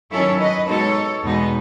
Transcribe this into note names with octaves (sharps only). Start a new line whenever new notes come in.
D#3 F#3 C#4 E4 A4 C#5
B4 D#5
B2 G#3 D#4 A4 C#5
E2 B2 G#3 B3 D#4